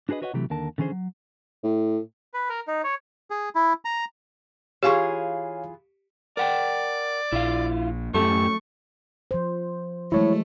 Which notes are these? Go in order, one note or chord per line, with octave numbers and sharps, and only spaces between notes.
D4 F#4 G#4 B4 D#5
F#4 B4 C#5 D#5 E5 F#5
C3 E3 F#3 A3 G4
D#2 D3 A#4 A5
D3 E3 C#4 G#4 C5
F#3
A2
B4
A#4
D#4
C#5
G#4
E4
A#5
E3 F4 G4 G#4 C#5 F5 G#5 C#6
A#4 D5 F#5 G5
A#1 E4 F4 F5
F#2 A2 A3 G4 A4 C#6
F3 C5
E3 F#3 G#3 A3 E4 C#5